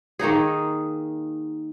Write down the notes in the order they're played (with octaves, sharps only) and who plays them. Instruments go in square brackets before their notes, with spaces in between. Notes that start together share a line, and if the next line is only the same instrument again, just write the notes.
[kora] D#3 A#3 D#4 G#4